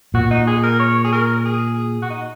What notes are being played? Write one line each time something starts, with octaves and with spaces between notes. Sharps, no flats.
A#2 F#4
D#4
G#4
A#4
C#5
G#4
A#4
G#4
F#4
D#4